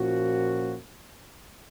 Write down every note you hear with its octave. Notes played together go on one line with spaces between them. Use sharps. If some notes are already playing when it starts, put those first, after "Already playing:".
Already playing: A#2 F3 A#3 C#4 F#4